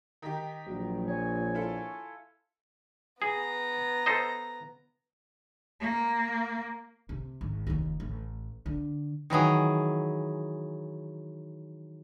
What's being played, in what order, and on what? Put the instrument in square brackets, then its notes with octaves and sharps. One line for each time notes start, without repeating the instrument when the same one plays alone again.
[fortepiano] D#3 D#4 G4 [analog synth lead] B6
[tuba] A#1 [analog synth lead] F#3
[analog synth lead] C#5 [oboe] G#5
[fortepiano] E4 F4 A4
[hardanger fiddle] B3 A#5 [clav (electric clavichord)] G#4
[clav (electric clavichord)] A4 C5 D#5
[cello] A#3
[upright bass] C3
G#1
F1 D#2
A1
D3
[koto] D#3 E3 F#3 G#4